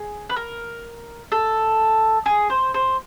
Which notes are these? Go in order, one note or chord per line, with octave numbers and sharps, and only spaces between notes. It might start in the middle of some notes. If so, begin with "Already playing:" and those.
Already playing: G#4
B4
A#4
A4
G#4
C5
C5